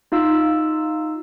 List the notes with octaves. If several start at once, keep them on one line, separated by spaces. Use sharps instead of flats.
D#4 F4 F5 E6